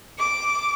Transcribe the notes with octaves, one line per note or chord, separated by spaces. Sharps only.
D6